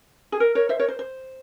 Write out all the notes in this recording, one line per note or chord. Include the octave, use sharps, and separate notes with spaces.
G#4
A#4
A#4 C#5
C5 E5
A#4 C#5
C5
C5